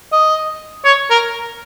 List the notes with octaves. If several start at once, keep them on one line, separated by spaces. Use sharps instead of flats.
D#5
C#5
A#4